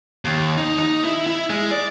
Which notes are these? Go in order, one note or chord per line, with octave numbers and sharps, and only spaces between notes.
D#2
D#4
D#4
E4
E4
G#3
D5